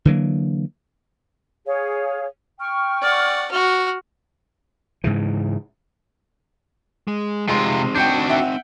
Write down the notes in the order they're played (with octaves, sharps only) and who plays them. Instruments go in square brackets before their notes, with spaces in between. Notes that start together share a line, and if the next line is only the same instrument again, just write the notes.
[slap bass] D3 E3 F#3 A#3
[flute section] G#4 C#5 F5
G5 C#6 F6
[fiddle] D5 F#5
F#4 F6
[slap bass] G#2 C#3 E3
[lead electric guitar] G#3
[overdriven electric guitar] C3 F4 [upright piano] G#3 C6 [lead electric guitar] C4 D#4
[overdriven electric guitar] D4 F#4 [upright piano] G5 G6
[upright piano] E5 F#5 G5